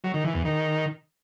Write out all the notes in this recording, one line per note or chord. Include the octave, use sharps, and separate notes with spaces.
F#3
D#3
E3
E2
D#3